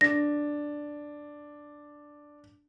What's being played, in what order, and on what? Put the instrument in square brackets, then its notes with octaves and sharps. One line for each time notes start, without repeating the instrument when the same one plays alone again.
[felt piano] D4 [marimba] A#6